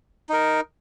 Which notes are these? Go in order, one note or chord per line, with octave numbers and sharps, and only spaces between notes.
D#4 A#4